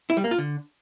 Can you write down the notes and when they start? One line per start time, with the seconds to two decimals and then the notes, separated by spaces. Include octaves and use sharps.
0.10 E4
0.17 G3
0.24 A#3
0.31 F4
0.38 D3